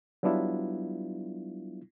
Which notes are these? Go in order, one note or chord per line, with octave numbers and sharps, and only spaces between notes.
F#3 G3 B3 D4 E4 F4